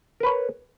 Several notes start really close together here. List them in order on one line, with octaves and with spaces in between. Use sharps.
A#4 B4 C#5